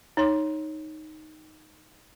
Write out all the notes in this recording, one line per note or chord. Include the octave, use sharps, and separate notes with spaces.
D#4 C#5 C6